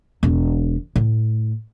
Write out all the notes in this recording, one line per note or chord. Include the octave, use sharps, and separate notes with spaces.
E1 G#3
A2